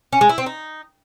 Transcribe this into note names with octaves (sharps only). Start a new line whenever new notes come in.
C#4
G#3
E4
C4
D#4